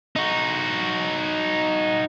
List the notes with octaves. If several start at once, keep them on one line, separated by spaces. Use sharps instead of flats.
D#4 F#4